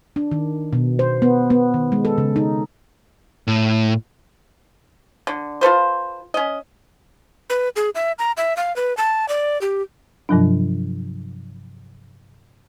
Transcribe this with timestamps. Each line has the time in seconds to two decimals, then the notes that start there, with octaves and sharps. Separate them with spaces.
0.16 D4
0.31 D#3
0.73 B2
0.99 C5
1.22 B3
1.50 B3
1.74 D#3
1.92 G#3
2.05 A4
2.18 C#3
2.36 D#4
3.47 A2
5.27 D3
5.61 F4 A4 B4 C5
6.34 C#4 D#5
7.50 B4
7.76 G#4
7.95 E5
8.19 A#5
8.37 E5
8.57 F5
8.76 B4
8.97 A5
9.29 D5
9.61 G4
10.29 G2 C3 F3 F#3 D4